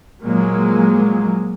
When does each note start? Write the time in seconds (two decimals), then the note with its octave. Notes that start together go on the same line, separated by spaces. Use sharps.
0.22 A#2 F3 F#3 G#3 A#3